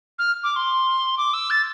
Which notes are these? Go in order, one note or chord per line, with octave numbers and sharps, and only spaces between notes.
F6
D6
C6
D6
E6
A6